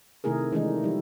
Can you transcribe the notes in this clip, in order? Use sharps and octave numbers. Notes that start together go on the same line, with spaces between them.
C3 D#3 A3 E4 G#4 A#4
D#3 E3 G#3 A3 D4 D#4
F3 G3 E4